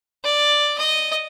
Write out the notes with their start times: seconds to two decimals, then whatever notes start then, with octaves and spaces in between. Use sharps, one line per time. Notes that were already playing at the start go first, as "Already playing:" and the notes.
0.24 D5
0.78 D#5